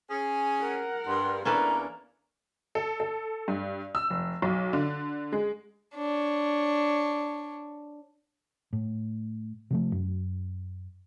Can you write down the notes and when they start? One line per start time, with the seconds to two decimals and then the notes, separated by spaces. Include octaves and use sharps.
0.10 C#4 G#4
0.59 A#4 F#5
1.08 G2 C6
1.45 E2 A#3 C#4 D4 A4 B4 A#5
2.75 A4
3.00 A4
3.48 G2
3.95 E6
4.10 F1
4.42 B1
4.73 D3
5.32 G#3
5.95 D4 C#5
8.73 A2
9.70 C3 F3 A3
9.92 F#2